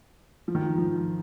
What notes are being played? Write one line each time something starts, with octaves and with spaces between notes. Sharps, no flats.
F3
D#3
F3
F3